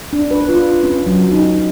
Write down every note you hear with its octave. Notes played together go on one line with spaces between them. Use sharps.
D4
B4
F4
C#4
F#3
D#4